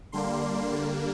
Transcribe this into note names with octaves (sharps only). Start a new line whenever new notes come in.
D3 G3 A#3 D4 C6